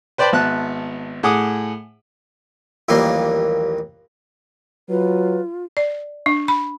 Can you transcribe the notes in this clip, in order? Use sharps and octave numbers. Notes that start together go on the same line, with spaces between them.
B4 C5 D5 G5 A5 B5
G#1 B3 E5 A5 F#6
A2 G#4 F#5 D6 D#6
A1 D#2 F3 G3 A#3 C6
F#3 F4 B4
D5
D4
B5